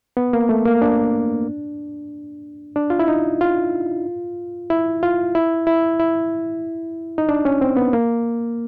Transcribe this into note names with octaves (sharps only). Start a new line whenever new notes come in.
B3
A#3
A3
A#3
D4
D4
F4
E4
D#4
F4
E4
F4
E4
E4
E4
D#4
D4
C#4
C4
B3
A#3